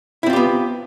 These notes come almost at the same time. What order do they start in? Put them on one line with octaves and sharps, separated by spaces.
E4 C4 F4 G4 B3